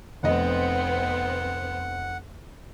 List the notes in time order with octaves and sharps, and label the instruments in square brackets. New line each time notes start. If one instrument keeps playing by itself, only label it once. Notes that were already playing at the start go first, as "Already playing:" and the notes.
[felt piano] F1 D#5 [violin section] B3 C4 [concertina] F#5